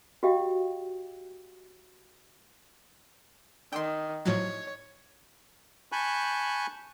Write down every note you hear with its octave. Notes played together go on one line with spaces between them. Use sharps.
F#4 G4 D#5 F5 G5
D#3 G5 C6
A2 F3 F#3 C#5
G#5 A5 B5 C#6 F#6 G6